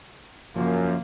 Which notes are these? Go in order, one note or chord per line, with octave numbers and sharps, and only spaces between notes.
F#2 C#3 F3 A#3